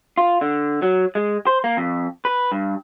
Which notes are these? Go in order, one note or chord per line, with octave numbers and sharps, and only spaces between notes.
F4
D3
F#3
G#3
C5
A#3
F2
B4
G2